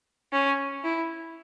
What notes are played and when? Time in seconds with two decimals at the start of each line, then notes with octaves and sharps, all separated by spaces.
0.33 C#4
0.84 E4